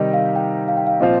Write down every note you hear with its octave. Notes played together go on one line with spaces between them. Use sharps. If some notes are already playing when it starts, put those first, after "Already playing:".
Already playing: C3 D#3 G3 D#4 G4 D#5
F5
G5
F5
G5
F5
A#2 F3 C4 F4 D#5